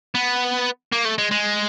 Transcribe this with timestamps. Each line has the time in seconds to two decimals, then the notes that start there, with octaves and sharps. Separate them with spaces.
0.15 B3
0.92 A#3
1.05 A3
1.18 G#3
1.31 G#3